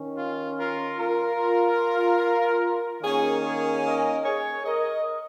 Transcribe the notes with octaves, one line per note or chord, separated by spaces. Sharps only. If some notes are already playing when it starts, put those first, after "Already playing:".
Already playing: D#3 C#4
F4
F4 A#4
F4 A#4
D#3 A#3 C#4 G#4 C#5
G#4 C#5
A#4 D#5
G#4 C#5
A#4 D#5